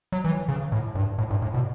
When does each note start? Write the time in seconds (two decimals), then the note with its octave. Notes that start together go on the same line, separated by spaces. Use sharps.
0.12 F#3
0.25 E3
0.49 C#3
0.72 A2
0.95 G2
1.18 A2
1.30 G2
1.42 A2
1.54 B2